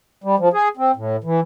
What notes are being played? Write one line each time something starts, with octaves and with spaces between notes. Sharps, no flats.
G3
F3
G#4
C4
A2
E3